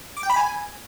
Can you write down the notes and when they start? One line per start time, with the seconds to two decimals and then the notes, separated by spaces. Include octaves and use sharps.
0.17 D6
0.23 G5
0.30 B5
0.36 G#5